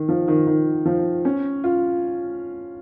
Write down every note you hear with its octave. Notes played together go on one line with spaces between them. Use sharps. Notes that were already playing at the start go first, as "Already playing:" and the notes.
Already playing: D#3
F3
D#3
D#3
F3
C#4
F4